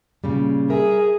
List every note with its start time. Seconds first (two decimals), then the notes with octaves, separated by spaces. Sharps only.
0.24 A#2 C#3 G3
0.70 G#4 A#4 E5